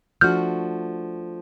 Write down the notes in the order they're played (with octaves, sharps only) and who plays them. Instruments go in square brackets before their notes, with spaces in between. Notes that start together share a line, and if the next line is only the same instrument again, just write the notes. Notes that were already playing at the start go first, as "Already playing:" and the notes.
[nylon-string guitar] F3 A3 D4 F#4 [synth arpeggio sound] F6 G6